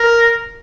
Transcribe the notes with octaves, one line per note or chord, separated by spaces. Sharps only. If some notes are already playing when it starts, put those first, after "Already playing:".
Already playing: A#4